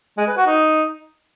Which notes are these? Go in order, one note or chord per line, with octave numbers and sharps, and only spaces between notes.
G#3
B4
F#4
D#4